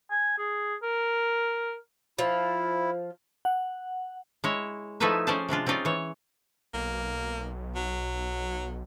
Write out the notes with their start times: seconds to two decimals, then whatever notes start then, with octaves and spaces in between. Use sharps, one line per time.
0.11 G#5
0.38 G#4
0.83 A#4
2.19 F3 E4
3.45 F#5
4.44 G#3 E4 C#5
5.00 F3 A3 D#4 E4 B4 E5
5.27 C#4 G#4 C5 D5 F5 A5
5.49 C3 G#3 D4 F4
5.66 C4 C#4 D#4 F4 D5
5.85 E3 C#5
6.74 B1 A#3
7.76 F#3